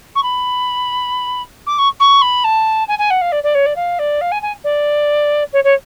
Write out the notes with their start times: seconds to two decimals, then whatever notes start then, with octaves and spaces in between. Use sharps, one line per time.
0.15 C#6
0.23 B5
1.66 D6
1.78 C#6
2.00 C#6
2.21 B5
2.44 A5
2.88 G#5
2.98 G#5
3.10 F#5
3.21 F5
3.32 D5
3.43 D5
3.54 C#5
3.66 D5
3.76 F5
3.99 D5
4.21 F5
4.31 G#5
4.42 G#5
4.64 D5
5.53 C#5
5.64 C#5